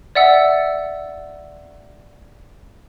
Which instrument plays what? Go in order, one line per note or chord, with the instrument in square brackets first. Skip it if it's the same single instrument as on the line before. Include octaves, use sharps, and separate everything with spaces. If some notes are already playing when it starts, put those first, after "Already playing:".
[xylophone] D5 E5 F#5 E6